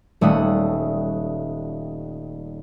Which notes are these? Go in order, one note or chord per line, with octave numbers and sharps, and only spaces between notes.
D#1 G3 A3 C#4 D#6 F#6